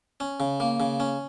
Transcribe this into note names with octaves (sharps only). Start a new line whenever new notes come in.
C#4
C#3
A#3
C#3
C#4